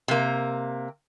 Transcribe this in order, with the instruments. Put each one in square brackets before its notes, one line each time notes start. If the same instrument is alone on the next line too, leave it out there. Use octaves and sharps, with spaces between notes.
[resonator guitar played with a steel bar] C3 A#3